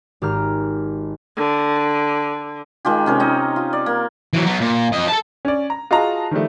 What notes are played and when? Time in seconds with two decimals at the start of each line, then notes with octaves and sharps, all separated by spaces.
0.22 G#1 G4 A#5 F6
1.37 D3
2.85 D#3 G#3 F4 G4
3.06 C3 C#4 A#4
3.20 D#4 D#5
3.56 F4
3.73 D5
3.86 A#3
4.33 E3 F#3
4.45 F#3 B3
4.60 A#2
4.92 F2 D#5
5.08 A4 A5
5.45 C#4 D5
5.70 A#5
5.91 F4 F#4 G#4 D#5 A5 A#5
6.31 D#3 F3 G3 A3